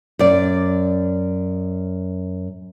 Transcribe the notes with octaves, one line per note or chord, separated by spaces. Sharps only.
F#2 D5